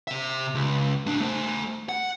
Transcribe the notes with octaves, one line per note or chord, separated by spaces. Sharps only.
C3 E5
C#2
A2 D4
A3 C5
F#5